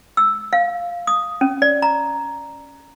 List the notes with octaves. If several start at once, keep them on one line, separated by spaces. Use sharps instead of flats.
E6
F5
D#6
C#4
D5
A#5